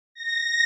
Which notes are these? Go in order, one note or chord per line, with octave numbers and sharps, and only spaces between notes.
A#6